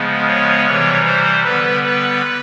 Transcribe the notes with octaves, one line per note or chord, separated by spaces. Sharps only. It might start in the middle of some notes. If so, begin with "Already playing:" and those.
Already playing: C#3 F3 G#3 B3
C#5
C3 E3 G3 C#5
C5
D3 G3 B3 B4
B4